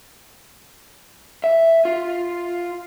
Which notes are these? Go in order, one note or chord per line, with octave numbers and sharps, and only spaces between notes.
E5
F4